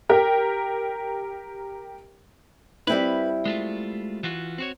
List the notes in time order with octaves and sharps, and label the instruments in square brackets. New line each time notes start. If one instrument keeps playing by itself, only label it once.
[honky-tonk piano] G4 A#4 G5
[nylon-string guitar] G3 C4 E4 [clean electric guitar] B4
[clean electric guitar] G#3 A3 F4
E3 F4 F#4
C4 F#4 C#5